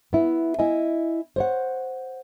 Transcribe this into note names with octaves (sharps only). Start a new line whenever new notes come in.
B3 E4
E4 D#5 G#5
C5 C#5 F#5